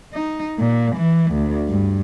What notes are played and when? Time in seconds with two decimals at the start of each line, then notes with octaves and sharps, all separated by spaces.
0.14 D#4
0.59 A#2
0.96 E3
1.31 D2
1.68 G2